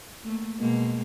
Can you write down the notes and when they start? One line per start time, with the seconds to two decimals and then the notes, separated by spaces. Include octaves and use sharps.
0.23 A3 A#3
0.59 B2 G#3 A#3